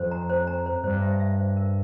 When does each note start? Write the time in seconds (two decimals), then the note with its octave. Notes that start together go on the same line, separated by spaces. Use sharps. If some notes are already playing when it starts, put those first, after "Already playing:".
Already playing: F2 C5
0.11 A#5
0.29 C5
0.47 A#5
0.66 C5
0.84 G2 C5
1.02 E5
1.20 E5
1.39 C5
1.57 A#4